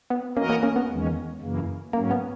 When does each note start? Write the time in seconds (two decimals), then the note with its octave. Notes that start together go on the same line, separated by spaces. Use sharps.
0.10 B3
0.37 E3 A#3 B3 C#4 F#4 A#4 D#5
0.49 A#3 C#4
0.63 A#3 C#4
0.76 B3
0.89 E2 D#3 G#3 C#4
1.41 F#2 C#3 E3 A#3
1.93 G#2 F#3 A#3 C#4
2.11 B3